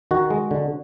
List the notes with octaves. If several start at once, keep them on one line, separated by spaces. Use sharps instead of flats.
D#3 F#4
G#3
D3